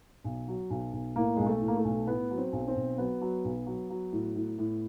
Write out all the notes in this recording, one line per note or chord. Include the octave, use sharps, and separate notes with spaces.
B1
F#3
B1
B1
A2 A#3
B1 G#3
A3
A2
A#3
A3
B1
A2 B3
F#3
C4
B1
C4
B1
F#3 B3
F#3
B1
F#3
F#3
A2
A2
A2